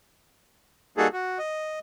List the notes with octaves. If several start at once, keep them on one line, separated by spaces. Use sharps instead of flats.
G3 A#3 D#4 F#4 G#4 A4
F#4
D#5